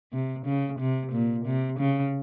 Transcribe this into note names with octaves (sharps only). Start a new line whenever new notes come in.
C3
C#3
C3
A#2
C3
C#3